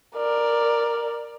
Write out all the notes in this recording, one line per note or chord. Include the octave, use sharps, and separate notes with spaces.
A#4 D5